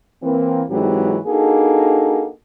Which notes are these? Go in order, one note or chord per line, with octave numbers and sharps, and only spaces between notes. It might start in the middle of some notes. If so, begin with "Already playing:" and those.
E3 A#3 C4
G#2 E3 F#3 G#3 C4 G4
A#3 D4 D#4 F#4 G#4 A4